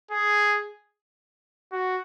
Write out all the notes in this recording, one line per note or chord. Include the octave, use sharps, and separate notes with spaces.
G#4
F#4